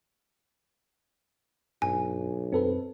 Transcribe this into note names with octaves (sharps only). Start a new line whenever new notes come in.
B1 G2 G#5
F#2 C4 A4 B4